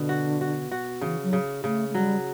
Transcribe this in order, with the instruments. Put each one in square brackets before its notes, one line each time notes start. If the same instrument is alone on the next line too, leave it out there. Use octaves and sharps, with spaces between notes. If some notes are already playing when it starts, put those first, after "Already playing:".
Already playing: [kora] B2 [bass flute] D3
[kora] F#4
F#4
F#4
[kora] C#3 [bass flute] E3
[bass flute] F#3
[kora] C#3
[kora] C#3 [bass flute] A3
[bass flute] A3
[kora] F#3 [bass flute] G3